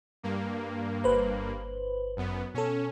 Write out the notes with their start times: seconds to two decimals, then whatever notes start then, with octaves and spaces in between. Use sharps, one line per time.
0.23 G2 A#3
1.04 G1 B4 C5
2.17 F#2 B3
2.54 B2 C#4 A4